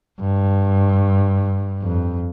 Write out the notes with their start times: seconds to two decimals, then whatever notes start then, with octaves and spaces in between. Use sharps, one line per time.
0.21 G2
1.82 F2